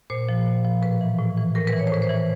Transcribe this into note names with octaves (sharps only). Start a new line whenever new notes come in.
A#2 C5
F3
A#2
F3
A2 B4
E3
A2
E3
A2 A#4
B4
E3
C#5
C5
A2 B4
C5
E3